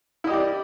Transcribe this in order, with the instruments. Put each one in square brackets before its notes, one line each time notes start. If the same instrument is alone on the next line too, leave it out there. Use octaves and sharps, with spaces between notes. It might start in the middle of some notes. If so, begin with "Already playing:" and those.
[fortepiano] E4
D#5
G4
D5